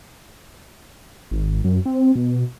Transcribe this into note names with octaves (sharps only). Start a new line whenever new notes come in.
G#1
F#2
C4
B2